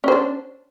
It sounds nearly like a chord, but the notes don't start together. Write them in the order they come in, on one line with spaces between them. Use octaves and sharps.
C#4 C5 D4